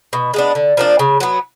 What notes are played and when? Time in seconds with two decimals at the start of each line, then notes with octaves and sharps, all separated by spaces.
0.13 B2
0.34 G#3 B3 D4
0.55 D3
0.77 F3 A#3 D4
0.99 C#3
1.20 F#3 B3